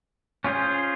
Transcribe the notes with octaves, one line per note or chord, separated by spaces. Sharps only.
C#4 F4 G#4 C5